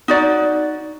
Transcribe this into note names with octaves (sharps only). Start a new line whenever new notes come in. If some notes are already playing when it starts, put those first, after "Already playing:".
D#4 F#4 D5